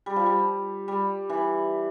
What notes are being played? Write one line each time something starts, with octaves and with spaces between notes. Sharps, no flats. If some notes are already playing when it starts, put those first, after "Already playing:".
G3
F3
G3
G3
E3